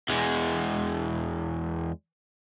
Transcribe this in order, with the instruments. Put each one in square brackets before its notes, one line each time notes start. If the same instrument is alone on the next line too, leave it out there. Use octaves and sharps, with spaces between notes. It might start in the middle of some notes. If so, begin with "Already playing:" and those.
[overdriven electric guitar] E2 G#3